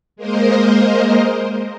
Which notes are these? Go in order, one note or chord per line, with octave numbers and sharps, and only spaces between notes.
G#3 A#3 A#4 C5 D#5